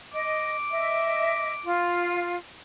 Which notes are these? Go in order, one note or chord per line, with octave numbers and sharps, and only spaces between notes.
D#5 D6
D#5 E5
F4